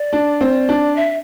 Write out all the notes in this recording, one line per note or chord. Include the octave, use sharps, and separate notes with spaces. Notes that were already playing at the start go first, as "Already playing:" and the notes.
Already playing: D5
D4
C4
D4
E5